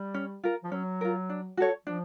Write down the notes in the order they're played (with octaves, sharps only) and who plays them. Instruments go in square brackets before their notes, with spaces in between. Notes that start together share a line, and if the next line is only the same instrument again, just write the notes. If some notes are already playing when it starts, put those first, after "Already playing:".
Already playing: [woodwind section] G3
[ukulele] C#4
F4 A#4
[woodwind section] F3
[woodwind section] F#3 [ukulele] C#4
[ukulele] F4 A#4
D4
F#4 A4 C#5
[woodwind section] F3 [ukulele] D4